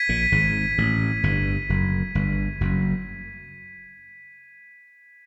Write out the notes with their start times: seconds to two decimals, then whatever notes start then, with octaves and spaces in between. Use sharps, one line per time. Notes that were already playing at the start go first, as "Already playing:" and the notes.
Already playing: G#6 B6 D#7
0.09 A#1 A#2
0.32 G#1 G#2
0.78 A1 A2
1.23 G1 G2
1.69 F#1 F#2
2.15 G1 G2
2.61 F#1 F#2